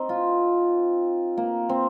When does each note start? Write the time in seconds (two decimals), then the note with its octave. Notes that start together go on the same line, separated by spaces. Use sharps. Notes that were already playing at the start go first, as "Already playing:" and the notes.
Already playing: C4 D#4
0.09 F4
1.37 A#3
1.69 C4